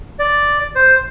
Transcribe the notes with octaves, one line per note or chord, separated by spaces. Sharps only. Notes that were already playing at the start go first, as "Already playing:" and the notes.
D5
C5